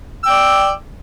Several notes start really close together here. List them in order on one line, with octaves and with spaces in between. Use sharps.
E6 G5 D5